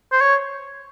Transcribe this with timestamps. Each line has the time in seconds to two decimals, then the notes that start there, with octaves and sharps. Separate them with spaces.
0.12 C5
0.21 C#5